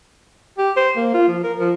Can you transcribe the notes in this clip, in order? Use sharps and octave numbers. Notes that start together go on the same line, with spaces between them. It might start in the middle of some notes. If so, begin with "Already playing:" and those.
G4
C5
A#3
F4
F3
A#4
F3